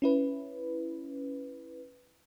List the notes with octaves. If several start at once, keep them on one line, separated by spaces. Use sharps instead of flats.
C#4 E4 B4